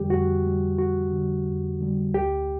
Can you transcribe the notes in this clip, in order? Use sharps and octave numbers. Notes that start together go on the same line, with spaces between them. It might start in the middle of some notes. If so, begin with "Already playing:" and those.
Already playing: F2 D3 G3 G4
F2 F#4
D3 G3
F2 F#4
D3 G3
F2
D3 G3
D2 G4